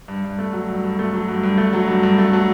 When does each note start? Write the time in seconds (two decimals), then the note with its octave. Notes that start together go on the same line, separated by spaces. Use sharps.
0.08 G2
0.24 G2
0.39 A3
0.53 F#3
0.68 G2
0.84 G2
0.99 A3
1.14 F#3
1.29 G2
1.43 G2
1.58 A3
1.73 F#3
1.88 G2
2.03 G2
2.18 A3
2.33 F#3